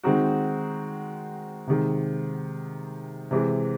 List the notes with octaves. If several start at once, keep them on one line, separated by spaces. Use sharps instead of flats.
D#3 G#3 C4 D#4 F#4
C3 D#3 G#3
C3 E3 G#3